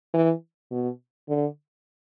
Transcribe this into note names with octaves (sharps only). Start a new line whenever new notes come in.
E3
B2
D3